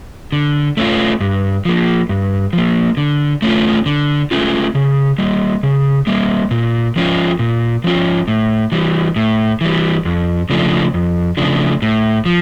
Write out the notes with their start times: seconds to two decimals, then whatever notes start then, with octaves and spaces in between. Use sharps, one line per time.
0.32 D3
0.77 A3 C#4 F4
1.20 G2
1.65 F3 A#3
2.09 G2
2.53 F3 A#3
2.97 D3
3.42 A3 C#4 F4
3.86 D3
4.31 A3 C#4 F4
4.75 C#3
5.18 G3 A#3
5.63 C#3
6.07 G3 A#3
6.51 A#2
6.96 F3 C#4 F4
7.39 A#2
7.84 F3 C#4 F4
8.28 A2
8.72 E3 G3
9.16 A2
9.61 E3 G3
10.05 F2
10.50 C#3 F3 A3 D4
10.94 F2
11.37 C#3 F3 A3 D4
11.82 A2
12.26 F3